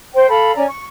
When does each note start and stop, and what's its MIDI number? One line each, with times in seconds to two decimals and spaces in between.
0.15 0.27 72
0.15 0.27 79
0.28 0.54 69
0.28 0.54 77
0.28 0.54 83
0.55 0.63 61
0.55 0.63 74
0.55 0.63 80
0.55 0.63 82
0.67 0.85 85